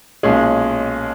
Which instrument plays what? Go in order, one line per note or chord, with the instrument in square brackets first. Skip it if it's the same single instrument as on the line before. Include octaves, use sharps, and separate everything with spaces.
[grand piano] B1 A#2 G#3 C#4 G#4